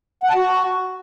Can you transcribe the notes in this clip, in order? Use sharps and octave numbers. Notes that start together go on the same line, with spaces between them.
F#5
A5
F#4